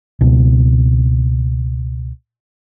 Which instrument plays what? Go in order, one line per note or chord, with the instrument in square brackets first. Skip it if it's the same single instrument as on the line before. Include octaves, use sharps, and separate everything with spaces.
[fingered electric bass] C#2 B2